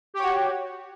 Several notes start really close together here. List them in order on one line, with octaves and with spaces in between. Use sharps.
G4 C#5 F#4